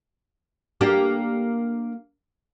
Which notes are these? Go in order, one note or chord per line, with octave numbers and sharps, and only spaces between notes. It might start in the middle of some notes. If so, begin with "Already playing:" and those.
A#3 D4 G4